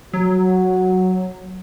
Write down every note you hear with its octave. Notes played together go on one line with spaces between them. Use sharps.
F#3 F#4